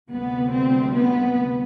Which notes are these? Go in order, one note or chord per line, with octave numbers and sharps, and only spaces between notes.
D2 C3 G3 B3
C4
B3